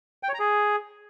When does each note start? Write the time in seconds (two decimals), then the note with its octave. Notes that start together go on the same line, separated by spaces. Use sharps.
0.23 G5
0.29 C#5
0.34 A#5
0.39 G#4